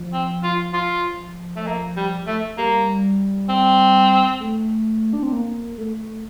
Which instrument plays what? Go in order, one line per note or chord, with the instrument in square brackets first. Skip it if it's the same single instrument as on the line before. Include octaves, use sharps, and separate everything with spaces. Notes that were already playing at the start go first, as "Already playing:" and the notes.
Already playing: [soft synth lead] F3
[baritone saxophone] C4
F4
F4
A3
A#3
G3
A3
[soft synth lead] G3 [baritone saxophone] A#3
[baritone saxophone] C4
[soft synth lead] A3
D4
C4
A#3
A3